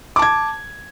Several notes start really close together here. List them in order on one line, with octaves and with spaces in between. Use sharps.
D6 A5 G#6